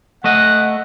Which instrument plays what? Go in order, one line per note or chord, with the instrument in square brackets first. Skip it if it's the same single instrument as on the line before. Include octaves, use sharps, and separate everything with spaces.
[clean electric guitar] A3 D#5 [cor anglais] F#5